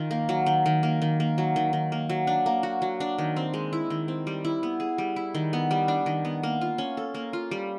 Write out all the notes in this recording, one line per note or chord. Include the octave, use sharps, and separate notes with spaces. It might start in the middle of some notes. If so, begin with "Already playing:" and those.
Already playing: D#3 F4
A#3
F#3
D#3
D#3
A#3
D#3
A#3
F#3
D#3
D#3
A#3
F#3
D4
A#3
F#4
F#3
D4
D#3
C4
G#3
E4
D#3
C4
G3
E4
B3
G#4
G3
E4
D#3
B3
G3
D4
D#3
B3
A#3
F4
C#4
A4
A#3
F4
G3